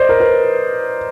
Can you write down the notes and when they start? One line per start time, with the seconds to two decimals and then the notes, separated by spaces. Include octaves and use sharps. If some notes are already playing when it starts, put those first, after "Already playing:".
Already playing: C5 D5 D#5
0.09 A#4
0.20 B4